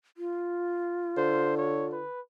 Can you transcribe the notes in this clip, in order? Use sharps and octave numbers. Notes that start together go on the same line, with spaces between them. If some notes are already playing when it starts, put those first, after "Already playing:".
F4
D3 C5
C#5
B4